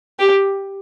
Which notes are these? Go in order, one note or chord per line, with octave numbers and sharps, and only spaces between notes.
G4